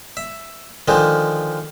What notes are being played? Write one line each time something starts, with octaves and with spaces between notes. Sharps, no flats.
E5
D3 D#3 F3 G#3